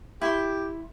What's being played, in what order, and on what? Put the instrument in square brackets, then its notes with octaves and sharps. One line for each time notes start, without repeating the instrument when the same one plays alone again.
[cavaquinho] E4 C6 [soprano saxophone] G4